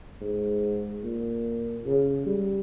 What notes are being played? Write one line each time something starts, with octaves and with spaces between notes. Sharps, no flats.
G#2
A#2
C#3
G3